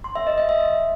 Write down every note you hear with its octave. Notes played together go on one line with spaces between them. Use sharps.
C6
E5
D#5
D#5
E5